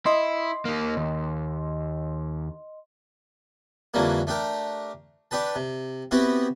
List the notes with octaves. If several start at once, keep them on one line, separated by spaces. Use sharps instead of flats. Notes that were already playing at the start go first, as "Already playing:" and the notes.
E4 D#5 C6
A#3 D#4
D#2
F2 D3 E3 F#3 G3 A#3
A3 D4 G4 A#4
D4 G4 B4 A5
C3
B3 C4 E4 F#4 G4